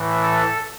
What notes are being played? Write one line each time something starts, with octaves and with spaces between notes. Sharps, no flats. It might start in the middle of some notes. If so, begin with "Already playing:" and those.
Already playing: A2 E3
A4